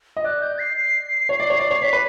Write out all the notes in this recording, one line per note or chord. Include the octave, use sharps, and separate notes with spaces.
D#5
D5 F#6
G6
C7
C7
C#5
D5
C#5
D5
C#5
C#5 B6
B4